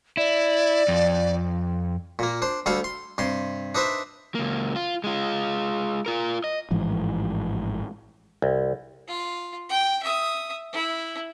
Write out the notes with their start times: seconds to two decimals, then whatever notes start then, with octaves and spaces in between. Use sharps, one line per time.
0.17 E4 D5
0.88 F2
2.19 A#2 A#3
2.42 D4 C5
2.66 D2 G3 A4 F5
2.84 C6
3.18 G2 C3 C6
3.75 D4 D#4 B4 C5 E5
4.35 C#2 A#3
4.76 F4
5.04 G#3 F4
6.06 F4 A#4
6.44 D#5
6.71 A1 G#2 E3 F3
8.42 C2
9.08 F4
9.69 G5
10.03 E5 D#6
10.73 E4